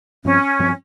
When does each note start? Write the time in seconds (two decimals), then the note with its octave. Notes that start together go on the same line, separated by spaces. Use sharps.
0.25 G2 F3 C4 C#4
0.59 G2 F3 C4